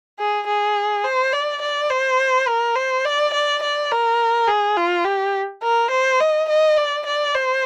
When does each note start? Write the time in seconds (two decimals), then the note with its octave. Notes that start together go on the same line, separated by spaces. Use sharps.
0.19 G#4
0.47 G#4
1.04 C5
1.33 D5
1.62 D5
1.90 C5
2.48 A#4
2.76 C5
3.05 D5
3.34 D5
3.63 D5
3.91 A#4
4.48 G#4
4.77 F4
5.05 G4
5.63 A#4
5.91 C5
6.20 D#5
6.49 D#5
6.77 D5
7.06 D5
7.34 C5